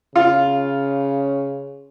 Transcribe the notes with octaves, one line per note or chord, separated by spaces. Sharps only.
C#3 F4